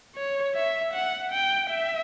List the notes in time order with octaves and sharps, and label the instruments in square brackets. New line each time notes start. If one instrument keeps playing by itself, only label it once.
[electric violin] C#5
E5
F#5
G5
E5